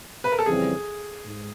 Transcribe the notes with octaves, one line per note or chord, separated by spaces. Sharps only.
B4
A#4
A4
F2 C#3 E3 G3 C4 G#4
G#2